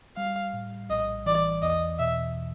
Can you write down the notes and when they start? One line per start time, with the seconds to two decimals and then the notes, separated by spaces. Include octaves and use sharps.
0.17 G3 F5
0.53 A2
0.90 A#1 D#5
1.26 E3 D5
1.62 E2 D#5
1.99 B2 E5